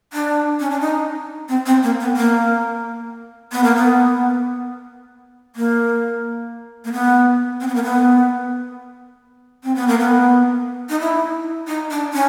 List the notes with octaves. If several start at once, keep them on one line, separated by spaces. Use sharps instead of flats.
D4
C#4
D4
D#4
C4
C4
A#3
B3
A#3
B3
A#3
B3
A#3
A#3
B3
C4
B3
A#3
B3
C4
B3
A#3
B3
D#4
E4
D#4
D4
C#4